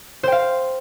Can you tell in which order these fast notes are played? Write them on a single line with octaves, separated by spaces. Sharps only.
C5 G5 F5